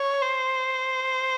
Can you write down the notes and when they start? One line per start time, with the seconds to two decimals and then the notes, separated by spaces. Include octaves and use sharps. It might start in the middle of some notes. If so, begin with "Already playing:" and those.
Already playing: C#5
0.22 C5